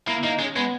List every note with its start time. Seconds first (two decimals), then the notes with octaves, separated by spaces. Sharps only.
0.07 A#3 E4
0.23 A#3 D#4
0.39 G#3 C#4
0.56 G#3 B3